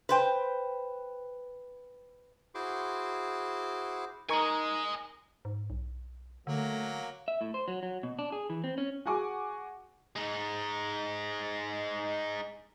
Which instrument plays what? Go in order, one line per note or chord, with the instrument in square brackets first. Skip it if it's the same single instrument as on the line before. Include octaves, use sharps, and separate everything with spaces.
[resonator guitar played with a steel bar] B4 C5 G5
[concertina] E4 F#4 G#4 C5 C6 D6
[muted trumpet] D#4 [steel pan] A#4 C#6 [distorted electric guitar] D#5 G#5
[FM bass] G#2
B1
[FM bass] D3 [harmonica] F#3 A#3 [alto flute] A3
[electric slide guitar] E5
A2
C5
F#3
F#3
B2
D4
G#4
E3
C4
C#4
[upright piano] F#4 G#4 F#5 G#5 C#6 D6
[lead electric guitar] G#3 D#4